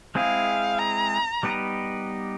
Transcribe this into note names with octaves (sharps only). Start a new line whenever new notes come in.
G#3 C4 E4 G#4 F5
A#5
G3 B3 D#4 G4 B4